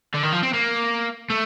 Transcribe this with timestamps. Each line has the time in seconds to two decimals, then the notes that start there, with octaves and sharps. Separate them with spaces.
0.14 D3
0.23 D#3
0.33 F3
0.43 C4
0.53 A#3
1.30 A3